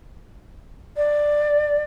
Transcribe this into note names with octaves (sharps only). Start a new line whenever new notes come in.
D5